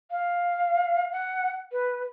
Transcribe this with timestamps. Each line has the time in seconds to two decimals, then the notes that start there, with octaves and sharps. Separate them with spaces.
0.11 F5
1.12 F#5
1.72 B4